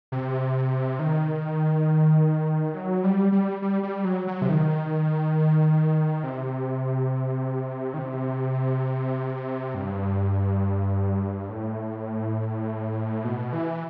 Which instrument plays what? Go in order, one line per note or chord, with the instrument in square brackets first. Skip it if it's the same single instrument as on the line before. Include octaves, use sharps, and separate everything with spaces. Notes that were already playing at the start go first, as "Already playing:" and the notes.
[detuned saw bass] C3
D#3
F#3
G3
G3
G3
G3
F#3
F#3
C3
D#3
C3
D#3
C3
G2
A2
B2
E3